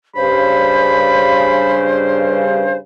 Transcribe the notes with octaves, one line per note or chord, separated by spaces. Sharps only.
G2 C#3 C5 B5